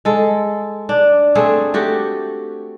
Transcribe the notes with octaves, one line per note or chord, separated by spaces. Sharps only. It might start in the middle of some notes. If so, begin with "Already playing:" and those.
G#3 A4
D4
A3 C4 G#4
A3 F#4 G4